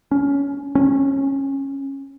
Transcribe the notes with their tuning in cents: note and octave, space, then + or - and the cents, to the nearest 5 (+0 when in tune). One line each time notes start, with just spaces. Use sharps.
C#4 +20
C#4 -20